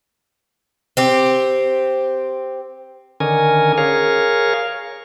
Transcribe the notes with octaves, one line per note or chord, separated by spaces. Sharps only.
C4 G4
D3 D#3 C#4 A#4 G#5
G#4 A#4 C#5 F5